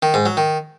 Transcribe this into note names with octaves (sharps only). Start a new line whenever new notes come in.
D#3
G#2
F#3
D#3